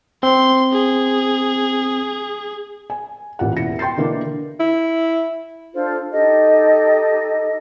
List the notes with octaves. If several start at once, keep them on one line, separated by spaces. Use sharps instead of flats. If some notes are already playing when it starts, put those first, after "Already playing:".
C4 C6
G#4
G#5
A1 A#2 F4 G4 F#5
E1 E4 A#6 C#7
G5 C6 G6 A6 C7
B2 D3 E3 A#3 B3 D4
E4
D4 F4 A4 C5
D#4 G4 A4 D#5